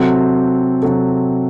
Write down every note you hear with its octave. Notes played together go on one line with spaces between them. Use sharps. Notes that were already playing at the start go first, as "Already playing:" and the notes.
Already playing: C3 F#3 C4 F#4 A4
C3 F#3 C4 F#4 A4